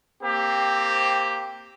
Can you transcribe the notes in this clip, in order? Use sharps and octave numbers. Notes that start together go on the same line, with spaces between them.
A#3 C4 G4